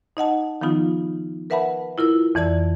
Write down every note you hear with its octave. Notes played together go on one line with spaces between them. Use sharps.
D#4 D#5 F#5 A5
D#3 F3 B3 D#4 F4
A#4 B4 E5 F#5 A5 B5
E4 F4 A#4 E6
F2 E3 D5 A5 G#6